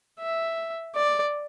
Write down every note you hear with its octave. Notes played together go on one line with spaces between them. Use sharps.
E5
D5